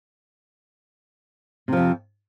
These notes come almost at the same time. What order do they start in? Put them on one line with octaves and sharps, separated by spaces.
C3 F3 F2